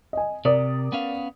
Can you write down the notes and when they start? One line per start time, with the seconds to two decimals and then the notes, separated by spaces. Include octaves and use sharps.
0.13 D#5 G#5
0.45 C3 A#4 D5 D#6
0.92 B3 C#4 F5